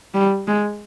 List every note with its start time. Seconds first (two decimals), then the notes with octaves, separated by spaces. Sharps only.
0.14 G3
0.47 G#3